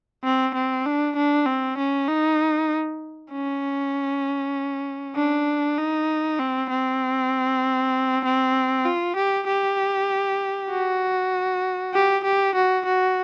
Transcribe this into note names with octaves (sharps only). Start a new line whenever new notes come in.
C4
C4
D4
D4
C4
C#4
D#4
C#4
D4
D#4
C4
C4
C4
F4
G4
G4
F#4
G4
G4
F#4
F#4